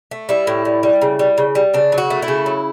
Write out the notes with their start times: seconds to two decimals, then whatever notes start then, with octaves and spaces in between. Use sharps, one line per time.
0.11 A3
0.29 G3 E4
0.47 A2
0.65 G3
0.83 G3
1.02 C#3
1.19 G3
1.38 C#3
1.55 G3
1.74 C#3 D4
1.92 F#3
1.98 F#4
2.10 A3
2.22 E4
2.28 C#3
2.46 F#3